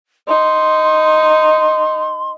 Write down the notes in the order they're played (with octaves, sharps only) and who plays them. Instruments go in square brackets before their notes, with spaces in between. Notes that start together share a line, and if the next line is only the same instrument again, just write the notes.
[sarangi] D#4 [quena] C6